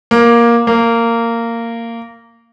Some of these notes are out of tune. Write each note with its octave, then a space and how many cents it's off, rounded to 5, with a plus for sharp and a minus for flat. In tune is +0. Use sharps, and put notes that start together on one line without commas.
A#3 +10
A#3 -15